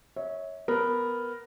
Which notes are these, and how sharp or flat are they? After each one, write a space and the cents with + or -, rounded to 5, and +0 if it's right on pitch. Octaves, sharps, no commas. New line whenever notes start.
C#5 +0 E5 -35
B3 +0 A#4 +0